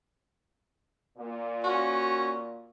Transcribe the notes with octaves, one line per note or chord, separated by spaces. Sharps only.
A#2
C#4 F#4